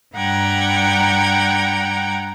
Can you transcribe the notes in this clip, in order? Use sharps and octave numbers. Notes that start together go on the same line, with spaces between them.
G2 G3 F#5 G5 A#5 G#6